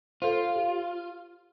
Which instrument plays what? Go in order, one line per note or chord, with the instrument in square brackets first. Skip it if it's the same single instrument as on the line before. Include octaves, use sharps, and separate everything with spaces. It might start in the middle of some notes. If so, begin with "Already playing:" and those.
[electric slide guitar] F4 [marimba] A4 C5
[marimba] G4